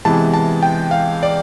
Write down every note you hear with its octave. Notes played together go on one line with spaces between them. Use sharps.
C3 E3 G#3 B3 A5
A5
G5
F5
D5